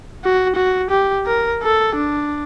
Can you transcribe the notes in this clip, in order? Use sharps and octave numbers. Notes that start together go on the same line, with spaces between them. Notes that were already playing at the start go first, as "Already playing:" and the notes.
F#4
F#4
G4
A#4
A4
D4